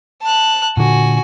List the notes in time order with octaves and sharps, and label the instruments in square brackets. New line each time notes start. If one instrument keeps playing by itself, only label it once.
[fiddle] A5 F#6
[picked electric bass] A#2 D3 [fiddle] F#4 G#5